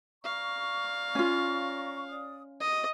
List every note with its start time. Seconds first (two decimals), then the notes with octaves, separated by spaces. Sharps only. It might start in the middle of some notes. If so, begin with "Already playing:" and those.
0.24 D5 F5 A#5 C#6
1.15 C#4 F4
2.09 D5 D#6
2.61 F#4 D#5